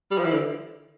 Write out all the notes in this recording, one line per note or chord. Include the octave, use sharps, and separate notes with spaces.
G3
F3
E3
D3